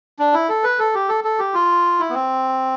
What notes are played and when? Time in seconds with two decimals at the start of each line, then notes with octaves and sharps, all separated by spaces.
0.19 D4
0.34 E4
0.49 A4
0.64 B4
0.79 A4
0.94 G4
1.09 A4
1.24 A4
1.39 G4
1.54 F4
1.99 E4
2.10 B3
2.14 C4